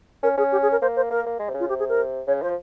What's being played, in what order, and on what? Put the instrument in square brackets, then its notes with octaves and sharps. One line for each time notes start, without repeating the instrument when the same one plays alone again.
[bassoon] C#4 [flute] A#4
[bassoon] C#4 [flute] G#4
[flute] G4
G#4
A#4
[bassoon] A#3 [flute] C5
[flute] C5
[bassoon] A#3 [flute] A#4
[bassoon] A#3
G#3
C3
C#3
[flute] F4
[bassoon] C3 [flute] G4
[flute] G#4
A#4
[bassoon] C#3 [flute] C#5
[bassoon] F3 [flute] C5